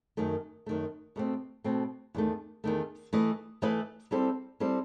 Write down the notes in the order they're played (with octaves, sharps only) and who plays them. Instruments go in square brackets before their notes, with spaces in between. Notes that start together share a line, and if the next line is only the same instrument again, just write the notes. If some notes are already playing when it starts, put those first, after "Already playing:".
[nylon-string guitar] F#2 D#3 A3
F#2 D#3 A3
B2 A3 C4
B2 A3 C4
E2 D#3 A3
E2 D#3 A3
E3 A3 E4 B4 D#5
E3 A3 E4 B4 D#5
G3 C4 E4 A4 C5
G3 C4 E4 A4 C5